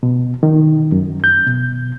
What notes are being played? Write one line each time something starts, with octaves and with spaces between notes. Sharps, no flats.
B2
D#3
F#2
G6
B2